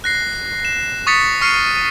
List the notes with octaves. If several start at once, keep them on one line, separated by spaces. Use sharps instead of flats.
F#6 A#6 C7
E7
C#6 D#6 A6 B6 C#7
C#6 F6 C7 C#7 D#7